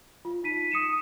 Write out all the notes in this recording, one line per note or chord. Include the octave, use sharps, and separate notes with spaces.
F4
D#4 B6 D#7
D#6 C#7 D#7 E7